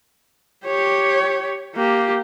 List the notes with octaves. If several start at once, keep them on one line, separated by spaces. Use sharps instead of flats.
G4 C#5
A#3 G4